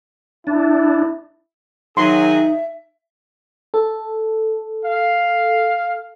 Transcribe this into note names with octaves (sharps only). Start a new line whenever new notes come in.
D4 E4
D#3 F#3 D#4 G#4 E5 C6
A4
F5